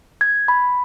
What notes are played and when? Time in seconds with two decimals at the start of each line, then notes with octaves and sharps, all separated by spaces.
0.21 G#6
0.48 B5